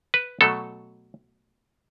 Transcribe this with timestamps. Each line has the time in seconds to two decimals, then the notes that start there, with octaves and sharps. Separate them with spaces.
0.14 B4
0.41 B2 F#3 A3 A4